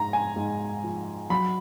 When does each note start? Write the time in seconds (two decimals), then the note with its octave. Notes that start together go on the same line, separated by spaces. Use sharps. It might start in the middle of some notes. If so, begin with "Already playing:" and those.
Already playing: G#2 A#5
0.13 G#5
0.36 G#2
0.84 F3
1.30 F#3 B5